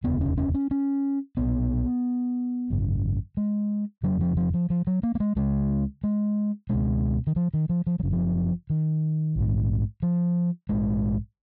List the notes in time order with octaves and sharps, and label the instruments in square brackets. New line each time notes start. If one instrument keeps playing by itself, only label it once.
[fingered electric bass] F1 D#2 C#3 B3
C#4
C#4
C#4
C#4
B1 A#2 B3
G#1 F#2 C#3
G#3
F1 F2 C#3 F#3
F3
F3
F3
F3
F#3
A#3
A#3
G#3
C#2 C#3 G#3
G#3
C#2 B2 G#3
D#3
F3
D#3
F3
F3
F#3
F#1 F#2 C#3
F3
D#3
A#1 G#2
F3
A#1 G#2 G#3